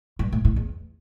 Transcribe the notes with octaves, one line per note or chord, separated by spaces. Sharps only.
G2
A2
A2
E2